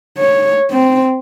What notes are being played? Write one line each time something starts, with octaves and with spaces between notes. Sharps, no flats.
C#5
C4